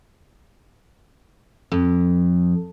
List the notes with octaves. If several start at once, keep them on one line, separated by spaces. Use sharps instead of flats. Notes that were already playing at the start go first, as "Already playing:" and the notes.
F2